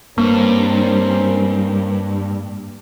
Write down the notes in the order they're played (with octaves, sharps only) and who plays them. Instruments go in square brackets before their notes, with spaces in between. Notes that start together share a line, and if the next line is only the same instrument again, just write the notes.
[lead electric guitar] G2 [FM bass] A#3 [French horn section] C4 C#4 A#4